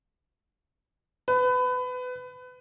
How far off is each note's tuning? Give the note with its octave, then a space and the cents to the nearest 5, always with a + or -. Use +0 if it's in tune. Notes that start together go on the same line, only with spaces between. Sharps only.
B4 +25